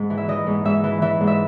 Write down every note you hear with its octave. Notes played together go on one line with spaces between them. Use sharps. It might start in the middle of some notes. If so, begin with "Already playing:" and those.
Already playing: G#2
E3
E5
E3 D#5
G#2
G#2 E5
E3
E3 E5
G#2
E5